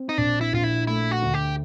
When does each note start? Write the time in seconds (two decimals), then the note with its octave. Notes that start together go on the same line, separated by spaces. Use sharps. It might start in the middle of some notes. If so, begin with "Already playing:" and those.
Already playing: C4
0.09 D#4
0.18 A#1 D4
0.41 E4
0.53 A#1 F4
0.64 E4
0.87 A3 E4
1.11 F#4
1.22 D2
1.34 G4